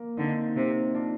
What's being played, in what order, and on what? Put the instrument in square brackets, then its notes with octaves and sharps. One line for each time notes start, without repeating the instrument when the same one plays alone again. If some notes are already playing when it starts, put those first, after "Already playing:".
Already playing: [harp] A#3
[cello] D3 [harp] C4 D#4
[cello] C3
[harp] D4 F4